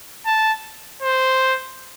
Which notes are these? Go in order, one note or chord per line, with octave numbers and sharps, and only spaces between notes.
A5
C5